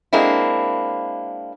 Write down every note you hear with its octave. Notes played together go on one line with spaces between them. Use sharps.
G#3 A#3 C4 D4 E4